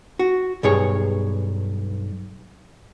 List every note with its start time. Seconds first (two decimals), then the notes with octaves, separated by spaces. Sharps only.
0.19 F#4
0.63 B1 G2 G#4 C#5